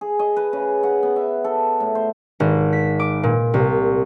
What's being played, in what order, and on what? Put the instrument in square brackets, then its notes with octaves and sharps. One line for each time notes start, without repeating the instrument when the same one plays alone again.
[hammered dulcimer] G#4
D#5
B4
C#3
F#5
B3
E5
A4
A2
C5
[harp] G#1
B6
D6
A#2
C2